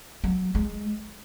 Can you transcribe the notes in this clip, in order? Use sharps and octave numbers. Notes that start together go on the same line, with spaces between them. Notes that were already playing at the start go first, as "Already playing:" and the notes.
F#3
G#3